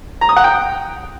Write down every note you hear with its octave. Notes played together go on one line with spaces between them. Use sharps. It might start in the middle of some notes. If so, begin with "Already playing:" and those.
A#5
D#6
F#5
G5